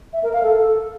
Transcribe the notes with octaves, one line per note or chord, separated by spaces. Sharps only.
E5
A#4
F5
A4